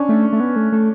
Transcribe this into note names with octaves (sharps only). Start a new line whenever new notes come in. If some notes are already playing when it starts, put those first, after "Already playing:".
Already playing: C#4 D4
A3
A3
B3
A3
A3